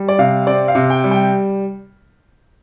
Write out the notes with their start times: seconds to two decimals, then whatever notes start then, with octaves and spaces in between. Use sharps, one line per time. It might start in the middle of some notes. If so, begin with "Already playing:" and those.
Already playing: G3
0.08 D5
0.19 C3 F5
0.47 C4 D5
0.68 F5
0.75 C3
0.90 G5
1.04 G3
1.11 G5